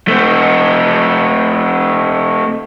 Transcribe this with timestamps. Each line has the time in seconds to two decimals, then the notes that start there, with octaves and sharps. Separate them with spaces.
0.08 A3 C4